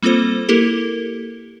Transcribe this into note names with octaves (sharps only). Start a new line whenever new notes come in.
G3 A#3 C4 F4 A4 C5
A#3 E4 G4 A4 A#4